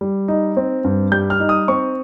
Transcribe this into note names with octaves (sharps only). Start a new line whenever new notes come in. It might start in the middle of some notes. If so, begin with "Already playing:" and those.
G3
D#4
C4
G2
G3 G6
F6
D#4
D#6
C4 C#6